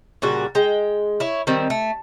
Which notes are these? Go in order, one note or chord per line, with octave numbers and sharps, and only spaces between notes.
A#2 C#3 G3 F#4
G#3 G5
E4 C#5
D#3 G3 C4
A3